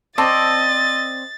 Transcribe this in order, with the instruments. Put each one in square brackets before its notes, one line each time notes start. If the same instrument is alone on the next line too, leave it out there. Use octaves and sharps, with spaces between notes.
[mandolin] C4 D5 [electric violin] D#5 [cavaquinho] A5 [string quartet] A6